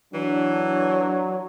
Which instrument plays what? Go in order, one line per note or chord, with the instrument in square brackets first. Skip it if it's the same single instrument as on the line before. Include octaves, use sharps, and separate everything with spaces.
[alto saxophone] E3 [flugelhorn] F#3 [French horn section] D4